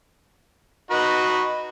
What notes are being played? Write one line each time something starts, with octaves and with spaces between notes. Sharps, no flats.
D#4 F#4 B4